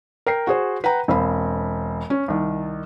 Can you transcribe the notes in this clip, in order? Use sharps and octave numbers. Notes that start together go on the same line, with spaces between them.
A#4 G5 C7
F#4 G#4 C5
B4 F#5 G5 A#5
E1 C4 C5 F5 B5
C#4
C2 D#3